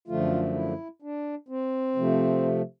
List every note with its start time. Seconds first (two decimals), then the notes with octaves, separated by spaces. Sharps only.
0.08 F#2 D3 F3 A3 F4
0.55 E4
1.02 D4
1.49 C4
1.96 C3 F3 A3